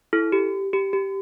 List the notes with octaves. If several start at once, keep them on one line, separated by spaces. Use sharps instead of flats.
E4 A4
G4
G4
G4